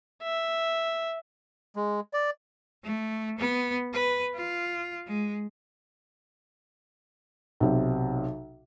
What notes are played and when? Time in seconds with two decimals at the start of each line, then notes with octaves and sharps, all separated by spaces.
0.22 E5
1.76 G#3
2.13 D5
2.84 A3
3.39 B3
3.94 B4
4.35 F4
5.07 G#3
7.60 B1 C3